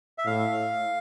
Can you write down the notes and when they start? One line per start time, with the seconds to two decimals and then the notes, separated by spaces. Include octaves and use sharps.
0.18 E5
0.25 A2 F5